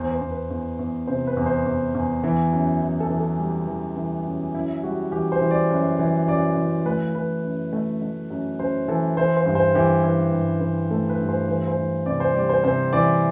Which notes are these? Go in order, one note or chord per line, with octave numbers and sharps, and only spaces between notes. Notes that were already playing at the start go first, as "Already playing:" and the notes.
Already playing: E2 C5
C5
E2
B4
E2
E2
C3 C5
B4
E2
C5
E2
E2
E3
F#2
E3
A4
E3
A4
G3
E3
E3
F#2
F#2 E4
G3 F#4
E3 G4
C5
E3
D5
F#2
E3
F#2 D5
E3
A3 B4
E3 B4
F#2
A3
A3
F#2
F#2 C5
E3 A4
E3 C5
C5
G2
C5
E3 G4
E3
G2
E3
A3 A4
B4
G2
C5
E3 C5
C5
E3
C3 D5
C5
G3 D5
C5
C3 C5
E3 D5